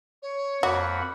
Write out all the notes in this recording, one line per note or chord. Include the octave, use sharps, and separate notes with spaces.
C#5
F2 A#3 F#4 F#5 B5